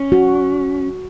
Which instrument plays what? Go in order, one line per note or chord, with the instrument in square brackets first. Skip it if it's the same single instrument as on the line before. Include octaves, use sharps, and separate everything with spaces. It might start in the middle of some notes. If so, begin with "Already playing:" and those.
Already playing: [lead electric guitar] C#4
[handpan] F#4